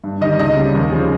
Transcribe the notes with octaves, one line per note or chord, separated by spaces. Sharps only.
G2
D#3 G3 D#5
C#2 D#5
C#3 G3
D#2
C#3 F3 G#3